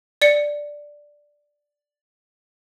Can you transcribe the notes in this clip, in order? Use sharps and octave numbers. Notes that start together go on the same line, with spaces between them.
D5 C#7